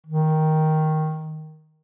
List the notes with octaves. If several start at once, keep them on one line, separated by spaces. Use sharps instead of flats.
D#3